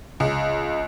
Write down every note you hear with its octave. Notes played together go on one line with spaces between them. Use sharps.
C#2